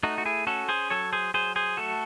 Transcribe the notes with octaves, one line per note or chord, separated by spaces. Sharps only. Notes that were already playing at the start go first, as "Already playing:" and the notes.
A3 D#4 F#4
F#4
E4 G#4
C#4 F#4 A4
G#4 C5
F#3 A4 C#5
G#4 C5
F#3 G#4 C5
G#4 C5
A3 F#4 A4